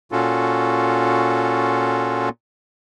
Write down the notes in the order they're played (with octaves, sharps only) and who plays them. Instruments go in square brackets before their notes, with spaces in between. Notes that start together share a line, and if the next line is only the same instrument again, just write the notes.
[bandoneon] A#2 C#4 F4 F#4 A4